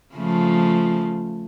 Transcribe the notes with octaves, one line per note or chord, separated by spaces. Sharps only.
C#3 F3 A3